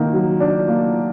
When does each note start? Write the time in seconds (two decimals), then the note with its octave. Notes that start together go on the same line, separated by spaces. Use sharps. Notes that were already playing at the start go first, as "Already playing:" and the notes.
Already playing: D#3 A#3
0.13 F#3
0.40 D4
0.68 A#3